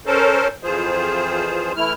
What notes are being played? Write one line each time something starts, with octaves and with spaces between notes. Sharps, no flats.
C#4 A4 A#4 C5
F2 E3 F3 F4 G#4 C5
E3 A3 E4 F6